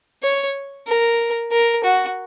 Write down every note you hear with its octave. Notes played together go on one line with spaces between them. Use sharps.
C#5
A#4
A#4
F#4